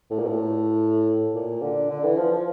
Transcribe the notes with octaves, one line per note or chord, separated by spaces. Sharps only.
A2
A#2
A2
A#2
D3
D3
E3
F3
F3